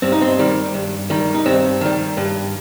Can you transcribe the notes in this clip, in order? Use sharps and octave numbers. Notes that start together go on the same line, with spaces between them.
G2 C4
D#4
C4
D#3 G3
G2
D#3 G3
D#4
G2 C4
D#3 G3
G2